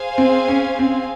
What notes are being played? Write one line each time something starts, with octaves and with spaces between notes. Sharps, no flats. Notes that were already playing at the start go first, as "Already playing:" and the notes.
Already playing: G#4 C5 F5 G#5
C4
C#4
C4